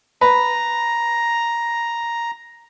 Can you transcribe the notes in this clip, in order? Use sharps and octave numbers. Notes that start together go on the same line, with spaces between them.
B4 A#5